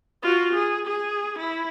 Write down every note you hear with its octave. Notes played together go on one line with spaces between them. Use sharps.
F4 F#4
G#4
G#4
E4